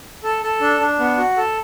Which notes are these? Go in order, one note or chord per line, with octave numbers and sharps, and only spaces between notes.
A4
A4
D4
D4
B3
F#4
A4